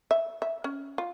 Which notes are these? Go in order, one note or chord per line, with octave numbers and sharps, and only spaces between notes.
E5
E5
C#4
F4